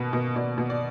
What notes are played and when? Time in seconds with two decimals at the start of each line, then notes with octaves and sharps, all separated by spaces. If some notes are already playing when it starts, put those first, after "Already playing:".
Already playing: B2 A#3 B4
0.13 B2
0.36 B2 D5
0.58 B2
0.70 D5